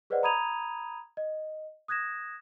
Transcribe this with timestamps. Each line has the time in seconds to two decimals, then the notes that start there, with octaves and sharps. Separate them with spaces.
0.10 G#4 B4 C5 D5 D#5 F#5
0.23 A#5 B5 D#6 G#6 D#7 F7
1.17 D#5
1.88 D#6 F#6 G#6 A#6 E7